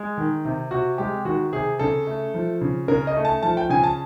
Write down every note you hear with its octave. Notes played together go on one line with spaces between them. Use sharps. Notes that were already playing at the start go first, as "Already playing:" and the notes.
Already playing: G#3
D#3
C3
C3 F#4
G#3 G4
D#3 F#4
C3 G#4
C#3 A4
A3
F3
C#3
C#3 A#4
D#5
A3
A5
F3 A5
G5
C#3 G#5
A5